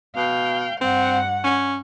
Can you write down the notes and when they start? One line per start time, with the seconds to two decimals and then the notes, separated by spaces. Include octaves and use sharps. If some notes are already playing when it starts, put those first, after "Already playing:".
0.16 B2 F5 G5
0.81 G2 C4 F#5
1.44 C#4